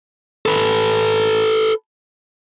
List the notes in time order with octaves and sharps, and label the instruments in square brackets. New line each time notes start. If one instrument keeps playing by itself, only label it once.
[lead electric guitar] A4 B4